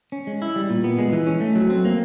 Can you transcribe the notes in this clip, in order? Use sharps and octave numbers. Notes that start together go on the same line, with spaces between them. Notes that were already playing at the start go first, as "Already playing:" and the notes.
C#4
G#3
E4
G3
A#2
B3
G#3
E3
C#4
A3
F#3
C4
A#3